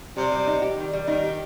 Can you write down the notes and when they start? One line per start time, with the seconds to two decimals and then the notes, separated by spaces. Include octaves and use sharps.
0.17 C3 G3
0.32 G3
0.47 D#4
0.62 G4
0.77 D#3 G3
0.93 G3
1.07 D#3 D#4
1.24 G4